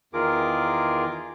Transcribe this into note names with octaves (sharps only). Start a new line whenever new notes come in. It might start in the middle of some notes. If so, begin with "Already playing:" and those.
E2 D#3 F4 G#4 A#4 D6